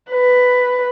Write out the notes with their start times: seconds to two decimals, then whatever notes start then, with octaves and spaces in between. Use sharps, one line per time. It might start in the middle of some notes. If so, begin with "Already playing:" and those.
0.11 B4